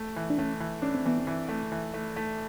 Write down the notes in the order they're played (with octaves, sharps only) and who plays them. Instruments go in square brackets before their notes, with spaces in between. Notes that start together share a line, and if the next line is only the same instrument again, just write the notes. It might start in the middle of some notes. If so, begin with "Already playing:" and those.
Already playing: [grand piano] A3
E3
[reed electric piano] D4
[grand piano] A3 [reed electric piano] C#4
[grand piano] E3
[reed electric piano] C#4 [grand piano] D4
[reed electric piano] C4
[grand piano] E3 [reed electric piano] B3
[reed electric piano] C4
[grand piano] E3
A3
E3
A3
A3